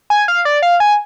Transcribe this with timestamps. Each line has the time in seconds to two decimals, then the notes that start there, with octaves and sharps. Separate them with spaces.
0.10 G#5
0.28 F5
0.45 D5
0.62 F5
0.80 G#5